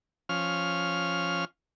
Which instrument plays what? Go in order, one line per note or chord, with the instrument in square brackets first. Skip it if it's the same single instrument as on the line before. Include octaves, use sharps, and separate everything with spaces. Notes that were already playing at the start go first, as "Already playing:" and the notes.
[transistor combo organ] F3 C#4 F6